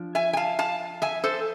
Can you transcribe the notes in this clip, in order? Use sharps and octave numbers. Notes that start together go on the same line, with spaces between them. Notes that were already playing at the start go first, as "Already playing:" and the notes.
Already playing: F3 D4
E5 G#5
G#5
F5 A5
F5 A5
E5 G#5
A4 C5